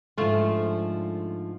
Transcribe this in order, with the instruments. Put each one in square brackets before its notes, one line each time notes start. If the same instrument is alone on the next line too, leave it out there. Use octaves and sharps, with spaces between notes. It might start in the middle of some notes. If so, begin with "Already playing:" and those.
[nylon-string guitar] G#2 D3 F3 [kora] A3 F4